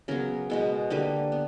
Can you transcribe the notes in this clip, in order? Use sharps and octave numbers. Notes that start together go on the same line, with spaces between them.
C#3 F#3 B3 A#4
B2 G#3 B3
D3 G3 A#3 B4
B3